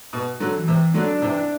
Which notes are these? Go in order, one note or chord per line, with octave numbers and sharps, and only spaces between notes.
B2
D3 F#3
E3
C3
D3 F#3 D4
C3 E3